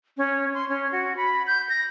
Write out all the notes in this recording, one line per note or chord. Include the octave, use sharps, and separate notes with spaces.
C#4
C6
C#4
F#4
B5
G6
A#6